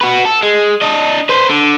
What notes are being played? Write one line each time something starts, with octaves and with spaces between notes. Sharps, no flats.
F#4 B4
A4
G#3
D4 D#5
B4 C5
D3